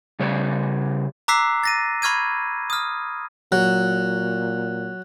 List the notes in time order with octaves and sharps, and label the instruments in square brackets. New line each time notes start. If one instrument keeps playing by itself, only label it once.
[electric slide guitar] C#3 G3 C#5
[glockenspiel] A#5 D6 E6 F#6 B6 C7
A6 A#6 D#7
B5 C#6 F6 G#6 D#7
D#6 F6
[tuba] A#2 [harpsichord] F#3 [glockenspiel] F#6